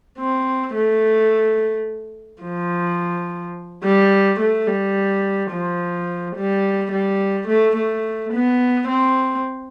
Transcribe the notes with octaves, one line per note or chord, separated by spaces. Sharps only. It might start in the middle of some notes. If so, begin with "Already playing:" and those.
C4
A3
F3
G3
A3
G3
F3
G3
G3
A3
A3
B3
C4